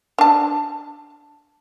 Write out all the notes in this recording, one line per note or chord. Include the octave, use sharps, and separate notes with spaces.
D4 A5